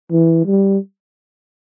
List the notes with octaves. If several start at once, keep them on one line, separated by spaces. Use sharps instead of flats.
E3
G3